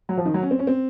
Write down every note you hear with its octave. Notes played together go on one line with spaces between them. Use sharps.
F#3
F3
D#3
F#3
C#4
C4
C#4
C4